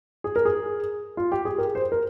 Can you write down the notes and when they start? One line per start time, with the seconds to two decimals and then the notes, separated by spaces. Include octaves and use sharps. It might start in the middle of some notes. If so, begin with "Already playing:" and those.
0.24 G#4
0.36 A#4
0.45 G#4
1.17 F4
1.32 G4
1.45 G#4
1.58 A#4
1.75 C5
1.92 A#4